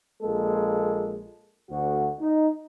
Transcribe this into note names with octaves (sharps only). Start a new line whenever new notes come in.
A#1 G#3 A#3 A4
D2 F#4
D#4